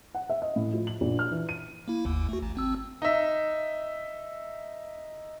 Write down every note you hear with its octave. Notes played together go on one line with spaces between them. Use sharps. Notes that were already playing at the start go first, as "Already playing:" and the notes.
F#5
E5
D#5
A2
F3
F#7
A#1
F6
E3
D#7
A#3 E4
G1 D#2
A3 F#4
A1
G#1 C4 E6
D#4 E5